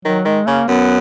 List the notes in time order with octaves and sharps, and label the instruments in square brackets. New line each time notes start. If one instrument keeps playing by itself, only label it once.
[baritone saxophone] D#3 [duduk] F#3
[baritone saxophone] D#3 [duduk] G#3
[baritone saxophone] C#3 [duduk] A#3
[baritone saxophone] F#2 [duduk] B3